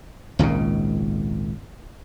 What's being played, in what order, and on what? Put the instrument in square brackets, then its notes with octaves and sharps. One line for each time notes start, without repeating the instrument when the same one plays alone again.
[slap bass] G#1 C#2 A#2 C#3